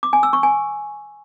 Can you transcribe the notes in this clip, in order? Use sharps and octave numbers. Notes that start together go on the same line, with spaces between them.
D6
G#5
E6
C#6
G#5